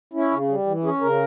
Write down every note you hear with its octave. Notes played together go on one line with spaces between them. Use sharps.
C#4 E4
C#3
G3
E3
C#4 G#4
C#3 A#4